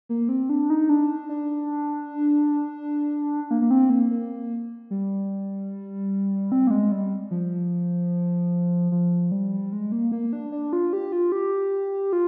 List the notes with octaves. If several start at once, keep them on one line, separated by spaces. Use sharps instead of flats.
A#3
C4
D4
D#4
D4
D4
A#3
A#3
C4
A#3
A#3
G3
C4
A#3
G#3
G3
F3
F3
G3
G#3
A#3
A#3
D4
D4
F4
G4
F4
G4
F4